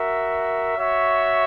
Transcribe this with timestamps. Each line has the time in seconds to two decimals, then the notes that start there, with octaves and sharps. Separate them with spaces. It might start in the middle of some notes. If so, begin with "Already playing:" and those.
Already playing: F#4 A#4 E5
0.76 F#4 C#5 E5